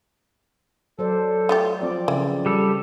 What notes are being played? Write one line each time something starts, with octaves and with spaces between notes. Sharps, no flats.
F#3 A4 C5 D5
A3 F4 G4
F3 C4 D5
C#3 E3
G3 A4